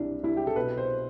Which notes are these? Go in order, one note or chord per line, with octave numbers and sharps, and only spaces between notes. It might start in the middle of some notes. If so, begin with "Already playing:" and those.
Already playing: C2 E3 D4
C2 E4
G4
A4
B2 B4
C5